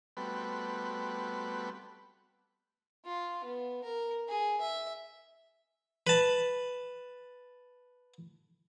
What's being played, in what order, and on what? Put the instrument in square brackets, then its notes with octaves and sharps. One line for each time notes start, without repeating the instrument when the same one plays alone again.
[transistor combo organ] G3 A3 B3 C4 F#4 B4
[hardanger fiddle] F4
B3
A#4
G#4
E5
[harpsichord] B4 A5